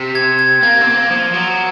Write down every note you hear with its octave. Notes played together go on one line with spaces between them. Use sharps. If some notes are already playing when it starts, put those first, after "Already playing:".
Already playing: C3
G#6
G#6
A#3 G#6
C4
A#3
F3
F#3